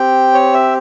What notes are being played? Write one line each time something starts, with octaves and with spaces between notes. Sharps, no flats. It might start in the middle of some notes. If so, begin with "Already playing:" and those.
Already playing: C4 G4 G5
C#5
E5